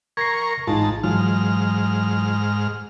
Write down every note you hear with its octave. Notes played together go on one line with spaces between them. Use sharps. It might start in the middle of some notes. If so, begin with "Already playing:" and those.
A#4 C#6 G#6 A#6 C7
A1 G#2 D#4 F4 A5
G#2 E3 F#3 F4 F6